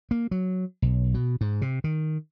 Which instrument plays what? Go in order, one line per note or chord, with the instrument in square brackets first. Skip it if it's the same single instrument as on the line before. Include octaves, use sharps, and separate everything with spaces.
[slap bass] A#3
F#3
B1
B2
G#2
C3
D#3